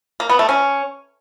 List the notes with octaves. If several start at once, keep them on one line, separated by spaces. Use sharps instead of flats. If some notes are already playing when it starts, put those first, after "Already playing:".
A#3
B3
A3
C#4